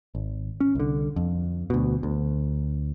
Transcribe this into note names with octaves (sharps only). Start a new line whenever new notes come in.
G#1
C#4
C2 D3
F2
D2 B2
D2